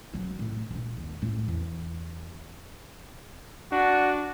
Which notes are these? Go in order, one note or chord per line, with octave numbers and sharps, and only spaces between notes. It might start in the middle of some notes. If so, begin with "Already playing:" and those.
C#3 F#3
A2 C3
A#1 D4
D#2
C#2 A2
E2
D4 F#4